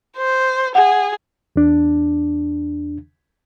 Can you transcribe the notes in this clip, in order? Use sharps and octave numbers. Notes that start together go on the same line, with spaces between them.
C5
G#4 F#5
E2 D4